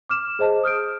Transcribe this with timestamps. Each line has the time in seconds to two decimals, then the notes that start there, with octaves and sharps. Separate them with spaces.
0.09 D6 F6 E7
0.39 G#4 C5 D#5 A5
0.63 D#6 F6 G6 D7